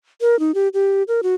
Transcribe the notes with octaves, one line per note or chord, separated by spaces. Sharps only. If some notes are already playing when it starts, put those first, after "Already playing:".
A#4
D#4
G4
G4
A#4
F#4